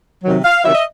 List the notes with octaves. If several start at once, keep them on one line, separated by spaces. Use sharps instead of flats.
C3 D#3 F#3
F5
C3 D#3 F#3 E5
D#5